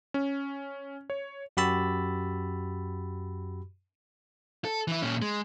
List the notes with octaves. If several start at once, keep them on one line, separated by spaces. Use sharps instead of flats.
C#4
C#5
F#2 F#4 G4 B5 E6 A6
A4
E3 E4
A#2 C#4
G#3